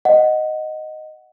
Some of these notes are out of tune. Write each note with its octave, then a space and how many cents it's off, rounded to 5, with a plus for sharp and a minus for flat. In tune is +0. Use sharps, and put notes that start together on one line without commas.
D#5 +0 F#5 +0